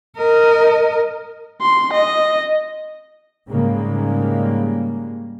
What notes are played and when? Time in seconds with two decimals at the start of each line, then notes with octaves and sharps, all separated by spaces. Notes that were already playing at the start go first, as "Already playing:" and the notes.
0.17 A#4 D#5
1.62 C6
1.93 D#5
3.48 G#2 C#3 G3 G#3 A#3